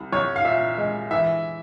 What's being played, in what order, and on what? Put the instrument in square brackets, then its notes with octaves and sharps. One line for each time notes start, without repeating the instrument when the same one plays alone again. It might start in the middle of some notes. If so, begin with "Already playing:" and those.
Already playing: [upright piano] C2
C2 C#5
F5
A#2 E5
G#3
E3 E5